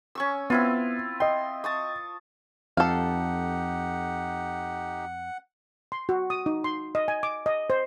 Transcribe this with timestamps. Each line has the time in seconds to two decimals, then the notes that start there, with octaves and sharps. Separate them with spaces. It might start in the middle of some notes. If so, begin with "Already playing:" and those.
0.15 C#4 C#6 E6
0.50 B3 C4 E4 F4
1.20 D#5 G5 C6
1.64 A5 C#6 D#6
2.77 F2 D#4 G4 A4 F5 F#5
5.92 C6
6.09 F#4
6.30 D#6
6.46 D#4
6.64 C6
6.95 D#5
7.08 G#5
7.23 D6
7.46 D#5
7.70 C5